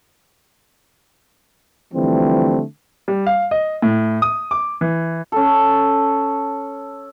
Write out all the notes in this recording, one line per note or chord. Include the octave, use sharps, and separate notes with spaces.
D3 E3 F3 G3 A3 C4
G3
F5
D#5
A2
D#6
D6
E3
C#4 A4